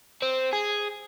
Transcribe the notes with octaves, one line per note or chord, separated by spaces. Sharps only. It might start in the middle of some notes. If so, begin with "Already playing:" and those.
C4
G#4